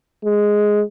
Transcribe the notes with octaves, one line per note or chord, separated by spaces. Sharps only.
G#3